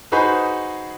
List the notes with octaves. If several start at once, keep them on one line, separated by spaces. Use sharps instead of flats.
D#4 F#4 G#4 B4 C5 B5